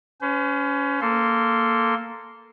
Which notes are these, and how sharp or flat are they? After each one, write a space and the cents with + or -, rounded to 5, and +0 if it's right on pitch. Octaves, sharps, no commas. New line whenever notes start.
C#4 +20 C5 -45
A#3 -10 A4 +0 C6 +0